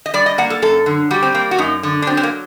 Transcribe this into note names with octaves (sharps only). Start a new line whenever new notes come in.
D#5
G3 D5
D#5
A#3 F#5
A4
F#2 A4
D3
G3 F#4
C4
A#3 C4
F#4
F#2 D#4
D3
D4
F#3 C4
C4
A#3